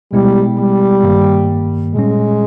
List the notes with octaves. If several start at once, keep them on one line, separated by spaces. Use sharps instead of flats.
B2 G3 G#3 B3 E4
G3
G2 D#3 A#3
A#2 G3 G#3 C#4